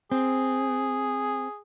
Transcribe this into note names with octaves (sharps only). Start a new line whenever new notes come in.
C4 G#4